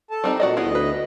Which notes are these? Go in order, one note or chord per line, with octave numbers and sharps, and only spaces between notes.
A4 A5
G3 C4 D#4
A#2 F#4 D5 D#5
D2 B3 E4 G#4 D#5
B4